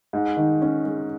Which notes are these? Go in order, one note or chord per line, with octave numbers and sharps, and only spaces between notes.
G#2
D#3
C#4
G#3